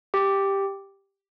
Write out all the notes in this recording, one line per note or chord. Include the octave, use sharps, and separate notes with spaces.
G4